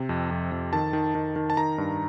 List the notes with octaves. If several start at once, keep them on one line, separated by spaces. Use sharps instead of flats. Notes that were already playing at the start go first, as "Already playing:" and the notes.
Already playing: C3
F2
F2
F2
D#3 A5
D#3
D#3
D#3
A5
D#3 A#5
G2